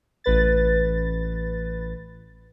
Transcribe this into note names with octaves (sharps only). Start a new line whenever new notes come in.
A1 B4 A6